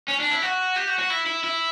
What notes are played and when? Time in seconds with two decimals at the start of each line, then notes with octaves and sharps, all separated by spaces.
0.08 C#4
0.20 D4
0.31 E4
0.42 F#4
0.76 G4
0.88 F#4
0.99 F#4
1.10 E4
1.26 E4
1.44 E4